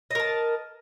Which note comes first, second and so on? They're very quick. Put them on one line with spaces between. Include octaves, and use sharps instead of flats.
D#5 A#4 A5